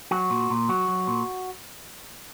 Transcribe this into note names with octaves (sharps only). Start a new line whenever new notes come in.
F#3 F#4
A#2
A#2
F#3 F#4
F#3
A#2